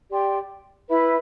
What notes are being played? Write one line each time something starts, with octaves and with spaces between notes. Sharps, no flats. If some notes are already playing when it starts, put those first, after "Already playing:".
G4 D5 G5 C6
E4 B4 E5 B5